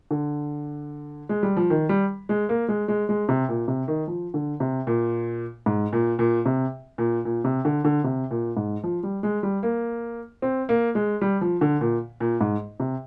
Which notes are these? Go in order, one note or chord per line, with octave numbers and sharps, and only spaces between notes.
D3
G#3
G3
F3
D#3
G3
G#3
A#3
G#3
G#3
G#3
C3
A#2
C3
D#3
F3
D3
C3
A#2
G#2
A#2
A#2
C3
A#2
A#2
C3
D3
D3
C3
A#2
G#2
F3
G3
G#3
G3
A#3
C4
A#3
G#3
G3
F3
D3
A#2
A#2
G#2
C3